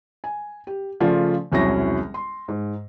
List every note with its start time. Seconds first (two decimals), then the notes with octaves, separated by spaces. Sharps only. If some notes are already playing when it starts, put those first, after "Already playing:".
0.24 G#5
0.67 G4
1.00 C#3 F3 A3 F4 D5
1.52 E1 C2 F#3 C#4 E4 A#6
2.14 C6
2.48 G#2